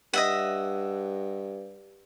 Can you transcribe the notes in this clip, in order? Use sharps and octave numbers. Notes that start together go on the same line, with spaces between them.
G2 D#5 E5 F#5